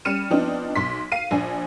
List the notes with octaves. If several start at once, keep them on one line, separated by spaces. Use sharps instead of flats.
G3 C#4 F6 C#7 D#7 E7
F3 B3 C4 D4 D#4
B1 C6 B6
F5 C7 D#7
A#1 D4 G#5